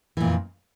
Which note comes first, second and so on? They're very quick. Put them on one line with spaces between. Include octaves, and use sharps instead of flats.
E3 A#2 F2